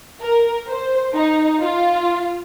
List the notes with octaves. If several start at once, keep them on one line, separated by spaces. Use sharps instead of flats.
A#4
C5
D#4
F4